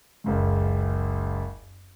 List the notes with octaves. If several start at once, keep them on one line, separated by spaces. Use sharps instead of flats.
F#1 C#2 F#2